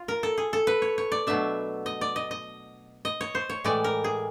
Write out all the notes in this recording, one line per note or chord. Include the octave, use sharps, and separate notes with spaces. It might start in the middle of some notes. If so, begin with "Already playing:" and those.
Already playing: F4
A#4
A4
G#4
A4
B4
C#5
C#5
D5
B2 F#3 A3 D4 E5
D#5
D5
D#5
D#5
D#5
C#5
C5
C#5
A2 E3 G#3 D5
A#4
G#4